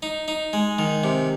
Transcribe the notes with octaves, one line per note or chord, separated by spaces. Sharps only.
D#4
D#4
G#3
D#3
C3